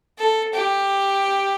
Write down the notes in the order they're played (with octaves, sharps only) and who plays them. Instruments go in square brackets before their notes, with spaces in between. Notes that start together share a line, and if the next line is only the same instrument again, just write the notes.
[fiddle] A4
G4